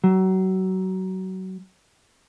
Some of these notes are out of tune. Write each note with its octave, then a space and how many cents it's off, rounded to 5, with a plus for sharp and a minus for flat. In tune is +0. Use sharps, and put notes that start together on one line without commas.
F#3 +25